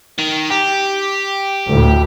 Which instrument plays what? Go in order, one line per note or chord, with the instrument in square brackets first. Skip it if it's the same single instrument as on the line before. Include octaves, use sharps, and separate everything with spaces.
[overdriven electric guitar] D#3
G4
[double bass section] D2 A2